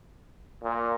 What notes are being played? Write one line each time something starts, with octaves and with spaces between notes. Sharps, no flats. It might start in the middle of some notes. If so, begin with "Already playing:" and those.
A#2